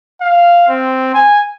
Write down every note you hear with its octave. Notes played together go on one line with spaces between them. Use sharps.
F5
C4
G#5